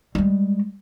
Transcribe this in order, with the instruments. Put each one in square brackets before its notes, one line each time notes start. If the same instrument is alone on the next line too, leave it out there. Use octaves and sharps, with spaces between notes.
[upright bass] G3 G#3